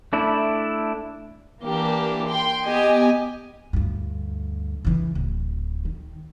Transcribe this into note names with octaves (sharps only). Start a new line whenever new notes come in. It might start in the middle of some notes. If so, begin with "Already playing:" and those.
A3 D4 E4
E3 A#3 D4 G4
G5 C6
B3 G4 D#5 G#5
D2 G2
C#3 E3
D1
D#3